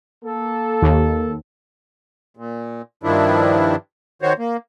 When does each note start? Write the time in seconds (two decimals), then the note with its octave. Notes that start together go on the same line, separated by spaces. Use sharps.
0.25 A#3 A4
0.82 D#2
2.37 A#2
3.03 G2 D#3 F3 D4 E4
4.22 D#3 F#4 C5 C#5
4.39 A#3